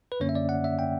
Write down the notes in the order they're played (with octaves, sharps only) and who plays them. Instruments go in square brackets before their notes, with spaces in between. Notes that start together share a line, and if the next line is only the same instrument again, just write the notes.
[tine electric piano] B4
F#2 D3 A#3 C#4 C#5
E5
D5
F#5
E5
G5